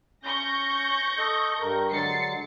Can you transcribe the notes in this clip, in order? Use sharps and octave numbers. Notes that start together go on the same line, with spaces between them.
C#4 C#6 G6 A#6
A4 D#5
G2 A#4
D3 F#3 G#3 A6 C7 C#7